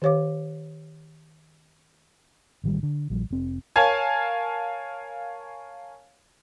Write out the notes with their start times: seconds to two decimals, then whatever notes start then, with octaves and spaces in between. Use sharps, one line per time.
0.02 D#3 G4 C#5 F5 D6
2.64 A1 D#3 G3
2.83 D3
3.10 A#1 F3 G3
3.30 F1 C4
3.76 A#4 C#5 F5 G#5 A5 G#6